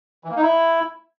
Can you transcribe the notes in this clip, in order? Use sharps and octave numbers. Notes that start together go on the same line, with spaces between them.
E3
A#3
D#4
E4